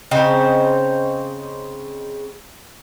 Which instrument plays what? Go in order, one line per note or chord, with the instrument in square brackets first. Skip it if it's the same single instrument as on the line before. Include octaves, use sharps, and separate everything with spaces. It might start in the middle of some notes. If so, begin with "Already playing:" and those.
[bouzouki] C#3 C4 D#4 C5